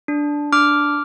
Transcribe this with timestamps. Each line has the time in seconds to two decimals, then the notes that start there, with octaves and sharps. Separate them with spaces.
0.08 D4
0.52 D4 D6 F6